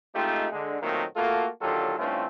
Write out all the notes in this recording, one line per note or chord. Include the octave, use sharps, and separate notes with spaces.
G#3 A3 C4 D#4 F4 G4
D3 G#3
A#2 D#3 F#3 A3 A#3 C4
A3 A#3 F4 F#4 A4
D#2 D3 F#3 F4 G4 A4
G2 E3 A3 C4 C#4 F4